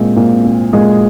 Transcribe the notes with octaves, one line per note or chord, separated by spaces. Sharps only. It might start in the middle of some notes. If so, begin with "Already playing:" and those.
Already playing: A#2 G#3 C4
A#2
C4
A#2 G#3 G#4